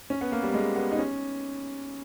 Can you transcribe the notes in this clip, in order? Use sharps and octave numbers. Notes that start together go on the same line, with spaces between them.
C#4
B3
A#3
G3
G#3
B3
D#4
C#4